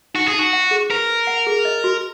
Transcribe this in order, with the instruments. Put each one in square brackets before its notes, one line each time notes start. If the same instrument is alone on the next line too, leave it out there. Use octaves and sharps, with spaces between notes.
[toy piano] D#4 [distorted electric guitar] F#4
[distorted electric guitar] G#4
[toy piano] D#4
[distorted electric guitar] F#4
[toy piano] F#5
G#4
[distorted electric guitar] A#4 [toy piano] B4
[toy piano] B4
F#5
G#4
D#5
F#4